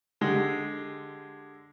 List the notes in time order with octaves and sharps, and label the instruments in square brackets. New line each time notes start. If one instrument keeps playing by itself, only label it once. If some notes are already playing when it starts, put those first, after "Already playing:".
[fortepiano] D3 G#3 G4